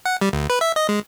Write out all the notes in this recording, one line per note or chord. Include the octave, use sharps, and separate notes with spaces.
F#5
G3
D2
B4
E5
D#5
G#3